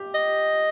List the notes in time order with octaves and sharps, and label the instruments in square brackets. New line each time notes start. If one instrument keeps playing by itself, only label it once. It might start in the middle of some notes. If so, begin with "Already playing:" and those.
Already playing: [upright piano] G4
[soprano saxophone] D#5